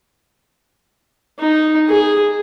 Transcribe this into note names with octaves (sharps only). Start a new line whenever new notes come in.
D#4
G#4